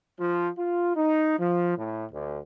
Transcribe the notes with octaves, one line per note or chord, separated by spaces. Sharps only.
F3
F4
D#4
F3
A2
D2